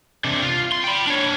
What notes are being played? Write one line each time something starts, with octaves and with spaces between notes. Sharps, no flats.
C3 D4
F4
C6
G5 B5
D4 C#5